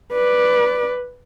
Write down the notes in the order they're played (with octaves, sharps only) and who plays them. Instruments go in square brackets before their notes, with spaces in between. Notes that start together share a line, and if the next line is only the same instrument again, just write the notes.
[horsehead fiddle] B4 D5